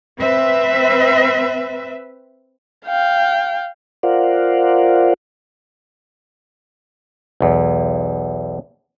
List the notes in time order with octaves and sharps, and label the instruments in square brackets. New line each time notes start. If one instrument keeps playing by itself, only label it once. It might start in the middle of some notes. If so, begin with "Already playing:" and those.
[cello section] C4 B4 E5
[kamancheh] F5 G5
[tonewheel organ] F4 A#4 C5 D5 F5 F#5
[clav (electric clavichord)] B1 E2